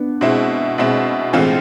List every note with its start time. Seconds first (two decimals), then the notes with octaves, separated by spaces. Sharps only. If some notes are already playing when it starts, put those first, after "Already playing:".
Already playing: B3 D4
0.21 B2 G#3 C4 E4
0.78 B2 G#3 C4 E4
1.33 A2 E3 G#3 C4 F4